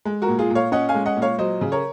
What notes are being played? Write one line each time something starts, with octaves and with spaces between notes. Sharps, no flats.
G#3
F#4 A#4
A#2
F4 G#4
A#2
C#5 F5
C#4 D#5 F#5
F5 G#5
G#3
D#5 F#5
A#2
C#5 F5
F#3 C5 D#5
C#3
A#4 C#5